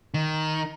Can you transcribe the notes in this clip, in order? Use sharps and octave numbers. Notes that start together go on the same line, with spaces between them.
D#3